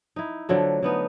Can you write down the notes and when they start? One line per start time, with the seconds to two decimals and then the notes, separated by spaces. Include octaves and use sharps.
0.16 D#4 E4
0.49 D3 F3 F#3 A3
0.83 D3 B3 D#4